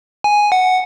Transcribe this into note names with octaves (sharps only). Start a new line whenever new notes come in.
G#5
F#5